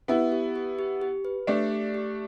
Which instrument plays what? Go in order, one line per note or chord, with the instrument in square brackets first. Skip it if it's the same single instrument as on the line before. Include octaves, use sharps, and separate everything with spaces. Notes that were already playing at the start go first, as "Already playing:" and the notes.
[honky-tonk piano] B3 E4 [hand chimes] G4
[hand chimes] G4
G4
G4
G4
B4
[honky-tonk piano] A3 D4 [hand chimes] G4
[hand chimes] G4
G4